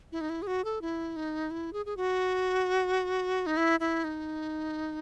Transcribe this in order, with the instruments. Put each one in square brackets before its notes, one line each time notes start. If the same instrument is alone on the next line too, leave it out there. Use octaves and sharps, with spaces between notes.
[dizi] E4
D#4
E4
G#4
F#4
A4
E4
D#4
E4
G#4
G#4
F#4
D#4
E4
E4
D#4